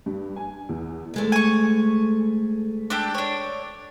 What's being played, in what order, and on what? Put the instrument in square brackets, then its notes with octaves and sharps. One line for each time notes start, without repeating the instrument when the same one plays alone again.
[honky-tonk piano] G2
G#5
E2
[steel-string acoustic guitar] D2 G#3 A3
[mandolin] G#5 C#6
D4 G4 A4
D4 C#5